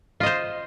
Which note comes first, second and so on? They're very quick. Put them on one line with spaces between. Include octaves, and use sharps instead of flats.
F4 D#5 C5